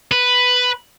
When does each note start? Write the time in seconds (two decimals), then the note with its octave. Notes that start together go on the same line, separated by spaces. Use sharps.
0.12 B4